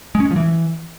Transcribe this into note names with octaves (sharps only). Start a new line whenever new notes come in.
G#3
C#4
G#3
F3
E3